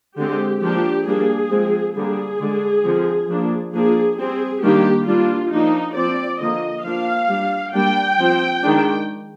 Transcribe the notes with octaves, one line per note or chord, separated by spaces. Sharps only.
D3 G#3 C4 G4
F3 A#3 D4 G4
G3 A#3 D4 G#4
F3 G#3 C4
D3 G3 A#3 D4 G#4
D3 G#3 D4
D3 F3 C4
F3 A#3 D4
F3 A#3 D4 G#4
G3 C4 G#4
D#3 G3 A#3 D4 G4
G3 A#3 D4 F4
F3 A#3 D4 D#4
F3 C4 D5
D3 F3 A#3 D#5
F3 A#3 D4 F5
G3 D4
G3 A#3 D4 G5
F3 C4
D#3 G#3 D4